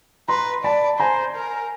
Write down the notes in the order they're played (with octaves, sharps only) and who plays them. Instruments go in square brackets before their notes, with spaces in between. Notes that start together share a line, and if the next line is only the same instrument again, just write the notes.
[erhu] B4 [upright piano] A#5 C6
[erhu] D5 [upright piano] A5 B5
[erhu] C5 [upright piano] G#5 A#5
[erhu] A#4